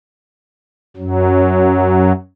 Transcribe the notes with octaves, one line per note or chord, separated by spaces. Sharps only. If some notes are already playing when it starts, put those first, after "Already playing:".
F#2 F#3